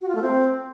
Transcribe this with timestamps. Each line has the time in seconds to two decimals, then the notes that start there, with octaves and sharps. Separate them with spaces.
0.01 F#4
0.08 F4
0.15 A3
0.22 C4